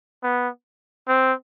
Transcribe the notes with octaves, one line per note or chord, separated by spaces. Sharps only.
B3
C4